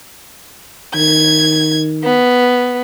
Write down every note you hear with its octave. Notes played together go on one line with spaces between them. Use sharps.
D#3 G#6
B3